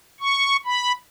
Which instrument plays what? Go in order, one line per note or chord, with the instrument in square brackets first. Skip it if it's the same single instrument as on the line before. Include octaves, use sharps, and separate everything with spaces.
[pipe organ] C#6
B5